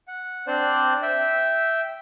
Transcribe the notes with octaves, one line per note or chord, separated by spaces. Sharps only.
F#5
C4 D4 C5 D5
E5 G5